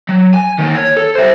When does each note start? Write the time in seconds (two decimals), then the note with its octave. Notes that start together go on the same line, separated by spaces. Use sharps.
0.09 F#3
0.34 G#5
0.58 D#3 A#3
0.75 C#5
0.97 A4
1.15 E4 C5